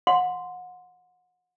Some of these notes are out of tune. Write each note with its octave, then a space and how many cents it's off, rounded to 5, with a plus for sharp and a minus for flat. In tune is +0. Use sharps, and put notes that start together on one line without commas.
F#5 -35 C6 -15